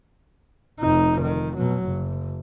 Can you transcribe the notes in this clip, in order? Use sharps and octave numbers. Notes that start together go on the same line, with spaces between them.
F1 D#4
D#3
B2 F#3
F#1